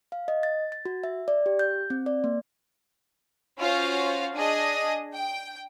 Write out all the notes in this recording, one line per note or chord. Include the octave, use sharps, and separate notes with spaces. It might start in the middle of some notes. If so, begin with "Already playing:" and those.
F5
D#5
A6
A6
F#4
E5
D5
G4
G6
C4
D5
A#3
C#4 F4 F#4 C5 F5
D4 G#4 D#5
G5